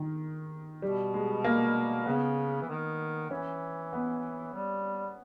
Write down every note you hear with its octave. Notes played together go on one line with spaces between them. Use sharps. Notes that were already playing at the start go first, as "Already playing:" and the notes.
Already playing: D#3
B2 G3
G#3
A#3
C#3 B3
E3
D#3
E3 C#4
B3
G3